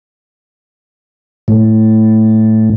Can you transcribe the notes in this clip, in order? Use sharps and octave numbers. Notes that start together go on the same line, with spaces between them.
A2